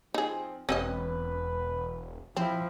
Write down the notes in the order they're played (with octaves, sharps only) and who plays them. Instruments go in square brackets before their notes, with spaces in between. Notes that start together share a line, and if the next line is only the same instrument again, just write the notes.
[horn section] F3 C4 [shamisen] D#4 G#4
[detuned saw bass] E1 [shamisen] C4 C#4 D#5 [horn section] B4
[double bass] F3 [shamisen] C4 [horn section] E4